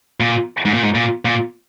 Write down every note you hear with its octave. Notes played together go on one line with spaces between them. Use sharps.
A#2
G#2
A#2
G#2
A#2
A#2